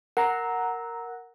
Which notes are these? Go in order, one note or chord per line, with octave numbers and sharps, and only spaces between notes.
A#4 F#5 A#5